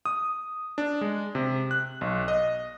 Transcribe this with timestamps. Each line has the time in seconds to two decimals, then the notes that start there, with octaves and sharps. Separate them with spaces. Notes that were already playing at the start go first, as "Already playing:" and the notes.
0.05 D#6
0.78 D4
1.01 G#3
1.35 C3
1.71 F#6
2.01 B1
2.28 D#5